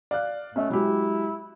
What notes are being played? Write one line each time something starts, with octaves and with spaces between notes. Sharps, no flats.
D5 F5 F#6
A3 C#4 D#5
F#3 G#3 E4 G4